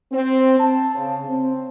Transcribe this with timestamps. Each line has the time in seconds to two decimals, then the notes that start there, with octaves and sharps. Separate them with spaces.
0.12 C4
0.60 A5
0.95 C#3
1.29 C4